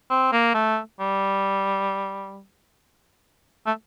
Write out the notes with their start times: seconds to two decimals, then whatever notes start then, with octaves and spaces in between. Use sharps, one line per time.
0.10 C4
0.32 A#3
0.54 A3
1.00 G3
3.66 A3